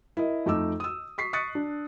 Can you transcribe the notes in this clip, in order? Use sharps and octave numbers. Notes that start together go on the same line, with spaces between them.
E4 A#4 D#5
F2 A3 D#4 D6 E6
D#6 E6
C#6 B6 C7
C#6 D#6 F#6 A6 B6 C#7
D4